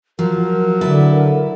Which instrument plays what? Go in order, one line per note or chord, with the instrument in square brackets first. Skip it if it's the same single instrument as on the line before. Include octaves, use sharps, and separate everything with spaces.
[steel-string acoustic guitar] F3 [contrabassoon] F#3 [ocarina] A#4
[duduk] D3 [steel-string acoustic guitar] E4 A4 B4